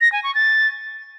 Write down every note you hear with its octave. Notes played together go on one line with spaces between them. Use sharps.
A#6
G#5
C#6
A6